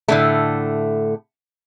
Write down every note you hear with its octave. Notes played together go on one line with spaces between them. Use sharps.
A2 D3 A3